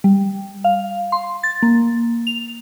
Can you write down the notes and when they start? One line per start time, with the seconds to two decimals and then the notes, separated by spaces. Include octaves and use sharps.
0.04 G3
0.64 F5
1.12 C6
1.43 A6
1.63 A#3
2.27 F7